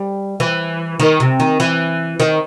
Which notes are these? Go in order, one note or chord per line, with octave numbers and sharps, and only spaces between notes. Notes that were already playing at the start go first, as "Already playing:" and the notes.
Already playing: G3
E3
D#3
C3
D#3
E3
D#3